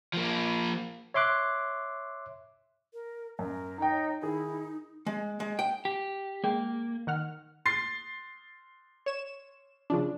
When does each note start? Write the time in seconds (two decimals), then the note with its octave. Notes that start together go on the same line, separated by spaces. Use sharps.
0.13 F3 A#3
1.14 C#5 E5 C6 D6 F#6
2.94 A#4
3.39 F#2 A#4
3.78 D#4 G5 A#5
3.91 C#5
4.22 D#3 D#4 E4 G#4
5.07 G#3
5.40 G#3
5.59 G5
5.85 G4
6.44 G#3 A#3 G5
7.07 D#3 F#5 F6
7.66 C6 A6 C7
9.06 C#5 E7
9.90 C#3 F3 D4